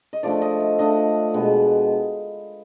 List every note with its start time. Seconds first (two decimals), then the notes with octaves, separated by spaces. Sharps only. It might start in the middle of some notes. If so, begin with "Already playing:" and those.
0.13 D#5
0.23 F3 A3 D4 D5
0.42 D#5
0.60 E5
0.79 F3 A3 D4 D#5
1.34 B2 G#3 B3 D4